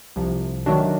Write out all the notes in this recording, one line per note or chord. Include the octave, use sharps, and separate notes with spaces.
C2 C3 F3
D#3 F#3 A3 D4 F#4